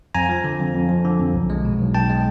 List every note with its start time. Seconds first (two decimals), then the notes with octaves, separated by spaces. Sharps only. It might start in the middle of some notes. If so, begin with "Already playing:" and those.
0.15 F2 G#5 A#5
0.29 F3
0.44 D3
0.59 F2
0.75 F2
0.89 F3
1.05 D3
1.19 F2
1.34 B1
1.50 G#3
1.65 B2
1.79 B1
1.94 B1 G5 A5
2.09 G#3